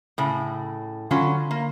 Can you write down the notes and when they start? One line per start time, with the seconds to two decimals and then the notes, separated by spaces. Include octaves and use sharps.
0.18 A2 C#3
1.11 D3 F#3 C#4 F4 B5 C6
1.51 A#3